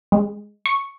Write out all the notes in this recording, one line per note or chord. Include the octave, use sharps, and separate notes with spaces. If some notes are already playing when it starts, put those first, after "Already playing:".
G#3
C#6